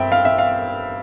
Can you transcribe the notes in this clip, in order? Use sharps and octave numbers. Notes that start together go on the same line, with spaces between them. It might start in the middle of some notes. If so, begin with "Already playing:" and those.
Already playing: G2 C4 E5 G5
F5
E5
F5